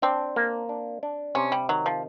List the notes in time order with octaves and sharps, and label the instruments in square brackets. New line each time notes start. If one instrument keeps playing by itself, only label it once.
[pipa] C4 [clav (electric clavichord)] D4
[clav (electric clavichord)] A#3
D4
D4
[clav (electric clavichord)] C3 [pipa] C#4
[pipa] G3
[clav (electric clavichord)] D#3 [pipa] F#3
[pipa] F3